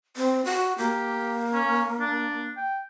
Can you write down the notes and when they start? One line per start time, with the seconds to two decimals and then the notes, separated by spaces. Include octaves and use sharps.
0.17 C4
0.45 F#4
0.78 A#3 G4
1.54 C#4
2.00 D4
2.57 G5